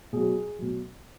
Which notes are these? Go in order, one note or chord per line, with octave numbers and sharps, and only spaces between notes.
B2 F#3 G#4
B2 F#3